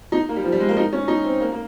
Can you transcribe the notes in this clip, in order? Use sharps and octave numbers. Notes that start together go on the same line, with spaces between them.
D#4
A#3
G3
F3
G3
G#3
A#3
D#4
C#4
D#4
C4
A#3
A#3